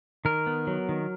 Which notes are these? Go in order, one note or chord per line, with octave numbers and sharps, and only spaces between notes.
D#3 A#4
B3
F#3
D#3